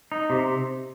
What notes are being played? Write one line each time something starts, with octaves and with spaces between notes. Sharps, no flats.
D#4
C3